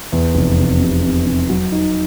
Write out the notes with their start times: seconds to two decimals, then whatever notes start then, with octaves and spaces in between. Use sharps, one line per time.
0.12 E2
0.35 F1
0.59 C3
0.80 C3
1.03 C3
1.26 C3
1.49 F#3
1.72 D#4